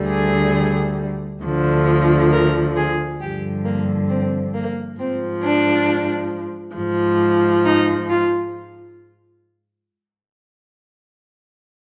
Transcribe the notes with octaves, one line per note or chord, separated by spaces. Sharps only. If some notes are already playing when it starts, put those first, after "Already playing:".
Already playing: D2 D3 G3
G#4
D2 D3 F3
A#4
G#4
G2 D3 F3 G4
A#3
C4
A#3
G#2 F3 C4
D4
G#2 F3
D#4
F4